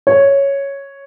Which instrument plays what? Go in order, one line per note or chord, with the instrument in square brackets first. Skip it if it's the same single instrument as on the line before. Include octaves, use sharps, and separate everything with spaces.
[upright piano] C#5